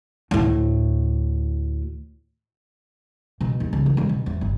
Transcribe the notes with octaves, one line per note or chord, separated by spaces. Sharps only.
D2 A2
B2
D#2
C#2
D#3
G2
B2
E2
G1